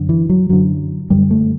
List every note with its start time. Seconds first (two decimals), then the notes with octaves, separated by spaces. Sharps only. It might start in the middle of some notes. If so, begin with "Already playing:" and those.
Already playing: F#2 D3
0.09 E3
0.29 F#3
0.49 F#2 D3 F#3
1.10 F#2 D3 G3
1.31 A3